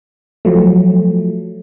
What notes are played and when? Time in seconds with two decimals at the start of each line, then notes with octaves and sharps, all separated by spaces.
0.45 F3 F#3 A3